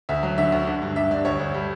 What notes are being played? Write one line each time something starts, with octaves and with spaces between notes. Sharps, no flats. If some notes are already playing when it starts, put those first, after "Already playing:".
D2 E5
F#3
D3 E5
D2
D3
G2
G2 E5
G2 D5
D2 C#5
D2
G3